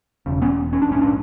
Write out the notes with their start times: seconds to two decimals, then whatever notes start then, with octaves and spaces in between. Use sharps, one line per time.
0.26 E1 E2 C#3
0.42 B3 C#4
0.73 C#4
0.82 D4
0.88 A#1 G#2 C#4
1.01 D4